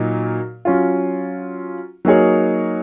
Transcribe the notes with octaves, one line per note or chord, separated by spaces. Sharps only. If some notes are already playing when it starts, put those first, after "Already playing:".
Already playing: A#2 F#3 A#3 D#4
F#3 C#4 F4
F#3 A#3 D#4 G#4 C#5